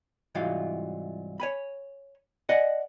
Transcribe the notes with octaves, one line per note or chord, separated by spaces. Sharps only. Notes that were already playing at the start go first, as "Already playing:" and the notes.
C2 G#2 E3 F#3 F4 F5
C#5 G#5 B5
D5 D#5 F#5 G#5